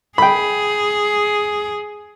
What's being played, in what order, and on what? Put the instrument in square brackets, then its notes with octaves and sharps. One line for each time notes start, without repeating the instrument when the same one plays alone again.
[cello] G#4 [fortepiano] G5 B5